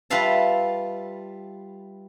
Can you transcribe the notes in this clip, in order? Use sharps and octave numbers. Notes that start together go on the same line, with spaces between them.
G3 F4 B4 E5 F5 A5